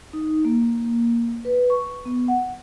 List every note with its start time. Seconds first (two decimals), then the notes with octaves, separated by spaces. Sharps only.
0.13 D#4
0.45 A#3
1.45 B4
1.70 C#6
2.05 B3
2.28 F#5